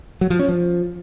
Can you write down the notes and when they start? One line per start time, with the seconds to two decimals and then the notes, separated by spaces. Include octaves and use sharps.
0.21 F#3
0.30 F3
0.39 C#4
0.49 F3